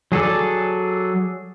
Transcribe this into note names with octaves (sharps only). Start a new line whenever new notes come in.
F#3 G#4 A4 D5